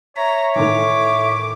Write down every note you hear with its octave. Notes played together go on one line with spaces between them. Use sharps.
C#5 E5 A#5
A2 D#3 E3 D6